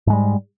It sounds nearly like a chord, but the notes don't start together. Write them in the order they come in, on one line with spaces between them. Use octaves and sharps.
G#2 G#3 G3